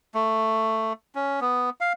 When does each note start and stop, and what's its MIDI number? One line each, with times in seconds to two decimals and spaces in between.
0.14 0.93 57
1.15 1.40 61
1.41 1.70 59
1.81 1.93 77